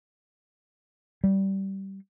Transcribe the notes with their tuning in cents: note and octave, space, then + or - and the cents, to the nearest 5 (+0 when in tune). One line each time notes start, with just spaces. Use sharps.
G3 -20